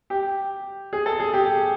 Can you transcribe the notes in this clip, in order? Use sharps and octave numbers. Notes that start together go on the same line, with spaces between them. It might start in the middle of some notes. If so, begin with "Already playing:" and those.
G4
G#4
A4
G#4
G4